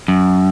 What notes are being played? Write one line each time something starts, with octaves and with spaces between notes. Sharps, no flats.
F#2